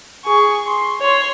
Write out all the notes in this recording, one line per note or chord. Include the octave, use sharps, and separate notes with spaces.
G#4 C#6
C6
C#5 C6